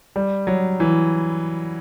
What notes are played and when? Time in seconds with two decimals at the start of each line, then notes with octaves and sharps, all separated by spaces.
0.16 G3
0.47 F#3
0.80 E3